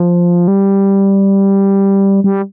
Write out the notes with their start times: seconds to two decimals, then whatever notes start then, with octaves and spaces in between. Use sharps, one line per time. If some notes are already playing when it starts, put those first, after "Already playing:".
Already playing: F3
0.48 G3
2.24 G3